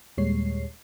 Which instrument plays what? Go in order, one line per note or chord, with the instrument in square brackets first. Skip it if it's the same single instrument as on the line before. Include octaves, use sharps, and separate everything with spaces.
[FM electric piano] D#2 A#2 G3 G#3 C#5 C7